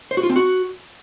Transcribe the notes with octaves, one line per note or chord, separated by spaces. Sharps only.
C5
F#4
F4
C4
F#4